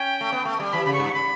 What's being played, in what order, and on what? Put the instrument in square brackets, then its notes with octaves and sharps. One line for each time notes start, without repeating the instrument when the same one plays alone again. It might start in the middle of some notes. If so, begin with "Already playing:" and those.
Already playing: [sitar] C#4 [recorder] G5
[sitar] A3
B3
A3
G3
[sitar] E3 [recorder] B5
[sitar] C#3 [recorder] B5
[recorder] C#6
[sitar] G2
[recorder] C#6
B5